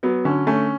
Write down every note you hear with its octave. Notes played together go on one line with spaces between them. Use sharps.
F#3 B3
D3 C#4
A3 C#4